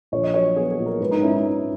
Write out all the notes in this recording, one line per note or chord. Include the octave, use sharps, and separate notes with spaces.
A#1 C#5
D#5
F#3 C#5
B3 G#4
G#4
A#2
A#4
G#2 B4
D#4
C#4 E4
D#4
G#2 E4